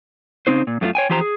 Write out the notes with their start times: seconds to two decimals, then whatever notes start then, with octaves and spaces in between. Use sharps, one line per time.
0.47 C#3 E3 C4 D#4 C5
0.67 A#2
0.81 F#2 A3 A#3 F4
0.95 C#5 G5 G#5
1.09 E3 F3 G4 C5 A#5
1.21 G#4